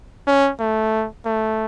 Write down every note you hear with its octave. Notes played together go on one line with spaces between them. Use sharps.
C#4
A3
A3